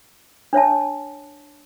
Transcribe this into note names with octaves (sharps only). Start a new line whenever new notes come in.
D4 C#5 E5 A5